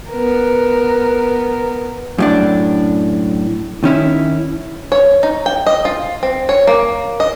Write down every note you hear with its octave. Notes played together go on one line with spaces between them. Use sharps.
B3 A#4
F#2 A2 D4
D#3 C#4 E4
C#5
D#4
G5
D#5
F4
C4
C#5
A#3
D#5